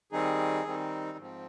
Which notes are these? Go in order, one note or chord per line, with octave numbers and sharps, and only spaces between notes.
D#3 G3 C4 D#4 G#4
D#3 G3 C4 D#4
G#2 F3 C4